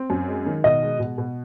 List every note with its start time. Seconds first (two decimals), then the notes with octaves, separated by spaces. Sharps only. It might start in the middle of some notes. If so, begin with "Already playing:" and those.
Already playing: C4
0.10 F#2
0.28 G#3
0.46 D#3
0.64 B2 D#5
0.82 G#3
1.00 B2
1.18 B2